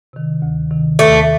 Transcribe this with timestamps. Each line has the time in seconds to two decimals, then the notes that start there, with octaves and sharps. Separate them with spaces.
0.13 C3 D#3
0.42 D2
0.70 C3 D#3
0.99 D#2 A3